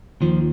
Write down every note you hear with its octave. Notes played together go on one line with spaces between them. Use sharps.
D#2 D#3 F3